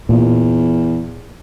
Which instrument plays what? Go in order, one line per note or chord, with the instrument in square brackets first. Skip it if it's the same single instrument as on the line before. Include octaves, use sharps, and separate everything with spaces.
[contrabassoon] E2 [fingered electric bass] A#2